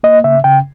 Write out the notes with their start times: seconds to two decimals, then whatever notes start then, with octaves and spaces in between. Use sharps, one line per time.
0.03 A#3 D#5
0.24 C#3 E5
0.44 C#3 G5